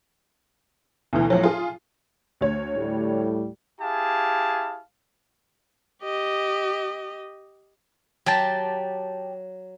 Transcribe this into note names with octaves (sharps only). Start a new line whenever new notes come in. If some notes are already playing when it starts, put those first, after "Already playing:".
D2 B2 E3
A2 F3 F#3
F4 G#4
D2 C#5
A2 G3
E4 G4 G#4 F5 A5
G4 D#5
F#3 G4 A5